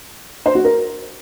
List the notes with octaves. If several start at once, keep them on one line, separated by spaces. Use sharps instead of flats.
C5
F#4
A#4